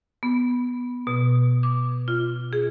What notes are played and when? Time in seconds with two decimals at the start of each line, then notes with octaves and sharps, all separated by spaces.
0.23 B3
1.07 B2
1.63 D6
2.08 F4
2.53 G#4